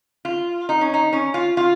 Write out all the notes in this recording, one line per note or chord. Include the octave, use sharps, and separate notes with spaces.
F4
D#4
C#4
D#4
C#4
F4
F4